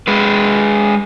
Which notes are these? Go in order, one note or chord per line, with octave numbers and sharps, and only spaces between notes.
G#3 B4